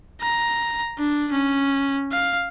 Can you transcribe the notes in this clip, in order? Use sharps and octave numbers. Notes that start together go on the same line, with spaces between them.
A#5
D4
C#4
F5